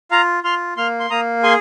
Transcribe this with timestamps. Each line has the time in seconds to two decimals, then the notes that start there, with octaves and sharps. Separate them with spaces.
0.11 F4 F5 A#5
0.44 F4 C6 F6
0.77 A#3 C6 F6
1.00 C6
1.10 A#3 A#5 D#6
1.43 G#4 G#5 C6